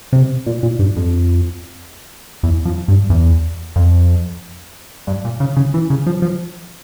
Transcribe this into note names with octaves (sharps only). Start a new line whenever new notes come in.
C3
A#2
A#2
G2
F2
E2
F2
G2
E2
F2
G2
A#2
C#3
C#3
E3
C#3
F3
F3